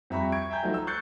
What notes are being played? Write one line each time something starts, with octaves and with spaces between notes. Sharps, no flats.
F2 G3 E5 A#5 B5 C#6
C#6 G#6 D7
E5 G5 G#5 A#5 G6
F3 A3 D#4 F#4
A#5 E6
C#6 F#6 G6 A6 C7 C#7